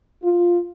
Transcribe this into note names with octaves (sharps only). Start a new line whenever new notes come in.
F4